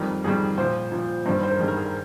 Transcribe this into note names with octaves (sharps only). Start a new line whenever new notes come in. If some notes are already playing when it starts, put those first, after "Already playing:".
Already playing: F2 D#3 G3 A#4
F2 D#3 G3 G#4
A#2 F3 C5
A#2 F3
G2 D#3 G3 C5
C5
A#4
G2 D#3 G3 G#4
A#4
G#4
A#4